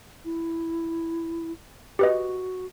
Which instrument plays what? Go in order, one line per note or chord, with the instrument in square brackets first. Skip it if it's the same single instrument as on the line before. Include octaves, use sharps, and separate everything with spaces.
[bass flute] E4
[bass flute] F#4 [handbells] G4 B4 D#5